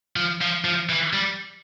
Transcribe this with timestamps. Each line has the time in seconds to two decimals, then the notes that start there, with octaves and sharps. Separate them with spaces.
0.16 F3
0.41 F3
0.65 F3
0.89 E3
1.13 G3